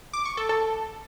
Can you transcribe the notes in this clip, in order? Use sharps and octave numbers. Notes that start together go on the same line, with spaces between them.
D6
C#6
A4
A4